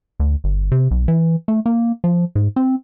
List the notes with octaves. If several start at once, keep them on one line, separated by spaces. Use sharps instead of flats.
D2
G1
C3
B1
E3
A3
A#3
F3
G#2
C4